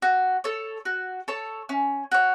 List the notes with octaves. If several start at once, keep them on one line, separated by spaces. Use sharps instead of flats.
F#4
A4 C#5
F#4
A4 C#5
C#4
F#4 C#5